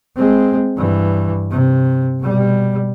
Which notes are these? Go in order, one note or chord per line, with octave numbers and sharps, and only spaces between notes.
G#3 C4
G2 E3
C3
B2 G3